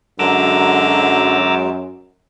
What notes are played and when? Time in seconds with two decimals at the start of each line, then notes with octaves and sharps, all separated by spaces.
0.19 F#2 D3 F#3 G#3 A#5 D6 E6